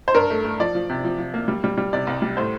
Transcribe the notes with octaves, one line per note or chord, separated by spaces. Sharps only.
C5
G2 A#4
A3
A3
F3 D5
F3
C3
F3
F3
A#3
G3
G3
G3
C3 D5
C2
G3
A2 C5